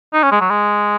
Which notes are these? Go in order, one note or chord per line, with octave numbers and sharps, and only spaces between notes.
D#4
C#4
G#3
F#3
G#3